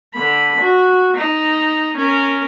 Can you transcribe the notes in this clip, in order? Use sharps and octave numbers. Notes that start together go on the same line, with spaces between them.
D3 B5
F#4
D#4
C#4 A#4